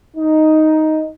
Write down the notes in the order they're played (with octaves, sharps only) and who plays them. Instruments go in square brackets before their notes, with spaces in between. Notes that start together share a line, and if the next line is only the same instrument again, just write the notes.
[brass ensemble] D#4